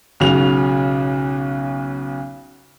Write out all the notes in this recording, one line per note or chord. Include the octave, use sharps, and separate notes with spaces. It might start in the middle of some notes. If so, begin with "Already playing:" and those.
B1 C#3 F#4 F7